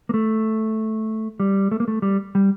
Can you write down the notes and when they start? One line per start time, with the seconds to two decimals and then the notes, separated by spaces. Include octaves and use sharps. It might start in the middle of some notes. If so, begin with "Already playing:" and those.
0.09 A#3
0.14 A3
1.40 G3
1.71 A3
1.80 A#3
1.88 A3
2.02 G3
2.35 G3